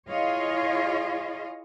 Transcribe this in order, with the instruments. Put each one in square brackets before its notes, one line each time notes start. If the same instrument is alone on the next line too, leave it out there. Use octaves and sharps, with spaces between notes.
[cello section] E4 F4 G#4 C#5 D#5 F5